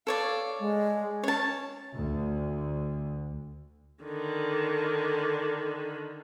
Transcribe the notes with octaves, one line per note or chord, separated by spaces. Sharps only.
A4 C#5 D5 F5
G#3
C#4 C#5 A5
D2
D3 D#3